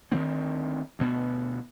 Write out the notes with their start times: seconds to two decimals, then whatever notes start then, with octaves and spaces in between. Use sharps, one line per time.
0.12 D2 D#3 B3 C4
0.99 D2 B2 B3